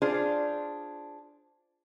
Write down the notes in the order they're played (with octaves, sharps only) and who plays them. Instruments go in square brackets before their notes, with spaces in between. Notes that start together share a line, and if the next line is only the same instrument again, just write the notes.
[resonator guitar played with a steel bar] D4 F4 G#4 C5